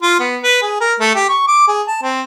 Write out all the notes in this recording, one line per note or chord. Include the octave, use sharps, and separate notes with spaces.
F4
B3
B4
G#4
A#4
A3
G4
C#6
D6
G#4
A5
C4